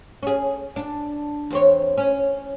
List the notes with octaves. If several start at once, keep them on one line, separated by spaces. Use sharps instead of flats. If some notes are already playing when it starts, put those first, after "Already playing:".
C#4 G#4
D4
E2 C4 C#5
C#4